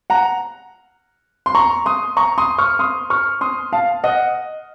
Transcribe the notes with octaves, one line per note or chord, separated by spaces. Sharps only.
F#5 A#5
C6
A#5 C#6
C6 D#6
A#5 C#6
C6 D#6
C#6 F6
C6 D#6
C#6 F6
C6 D#6
F5 A5
D#5 F#5